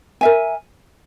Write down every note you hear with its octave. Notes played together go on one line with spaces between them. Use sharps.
A#4 E5 G#5